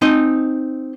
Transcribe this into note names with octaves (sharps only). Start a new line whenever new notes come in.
C4 D#4 D#5